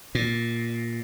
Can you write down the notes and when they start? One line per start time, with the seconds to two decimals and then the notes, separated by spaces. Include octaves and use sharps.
0.15 A#2